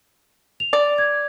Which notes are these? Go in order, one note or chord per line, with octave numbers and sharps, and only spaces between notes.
F7
D5
G#6